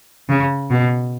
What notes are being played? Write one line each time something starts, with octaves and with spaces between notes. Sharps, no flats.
C#3
B2